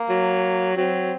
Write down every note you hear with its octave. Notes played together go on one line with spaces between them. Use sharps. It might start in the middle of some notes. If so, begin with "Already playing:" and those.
Already playing: A#3
F#3
F#3 C4